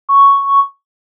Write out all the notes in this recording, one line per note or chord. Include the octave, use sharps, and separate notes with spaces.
C#6